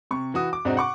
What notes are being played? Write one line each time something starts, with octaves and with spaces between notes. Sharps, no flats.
C3 C#6
E3 F#4 D#6
D6
G#2 C3 C4 D4 D#4 F#4
F#5 C#6 D6